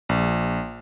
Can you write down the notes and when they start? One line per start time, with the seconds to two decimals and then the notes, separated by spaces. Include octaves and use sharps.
0.09 A#1